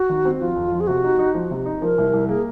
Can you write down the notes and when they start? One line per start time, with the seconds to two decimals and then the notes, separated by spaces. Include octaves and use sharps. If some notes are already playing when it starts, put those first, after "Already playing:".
Already playing: F#4
0.09 D#3
0.25 C4
0.41 F3 F4
0.56 F2
0.72 F3
0.80 G#4
0.87 C3 F#4
1.04 D#4
1.19 D#4
1.34 F3
1.51 C3
1.66 D#4
1.82 F3 A#4
1.98 C2
2.14 C2
2.29 A#3 G#4